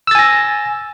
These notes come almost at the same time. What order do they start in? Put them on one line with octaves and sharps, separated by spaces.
E6 A6 G#5 A#6